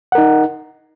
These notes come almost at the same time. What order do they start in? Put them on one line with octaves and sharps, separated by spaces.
F#5 A#4 D#4